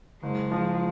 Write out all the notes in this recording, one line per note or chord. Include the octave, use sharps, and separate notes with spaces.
F#1 G#3
F3